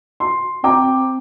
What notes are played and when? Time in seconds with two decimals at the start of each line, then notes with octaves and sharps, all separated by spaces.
0.20 C6
0.64 C4 G5 A#5 D6